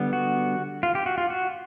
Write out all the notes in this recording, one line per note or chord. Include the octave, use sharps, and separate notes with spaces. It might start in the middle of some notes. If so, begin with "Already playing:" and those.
Already playing: D3 G3 B3
F#4
F4
G4
F#4
F4
F#4